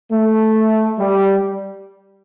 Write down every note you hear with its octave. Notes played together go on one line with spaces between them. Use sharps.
A3
G3